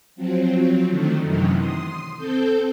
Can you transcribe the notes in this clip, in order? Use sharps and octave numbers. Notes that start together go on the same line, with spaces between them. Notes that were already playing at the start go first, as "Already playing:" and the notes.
F3 F#3 C4
D3 D#3 A3
F#2 C3 D#3 E3 F#3
C6 D#6
C4 A4 G6